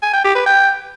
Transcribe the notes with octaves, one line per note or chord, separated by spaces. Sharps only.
G#5
G5
G4
B4
G5